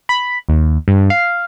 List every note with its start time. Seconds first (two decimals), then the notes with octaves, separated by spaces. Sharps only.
0.09 B5
0.49 D#2
0.88 G2
1.10 F5